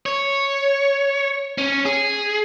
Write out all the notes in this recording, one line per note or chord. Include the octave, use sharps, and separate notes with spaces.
C#5
C#4
G#4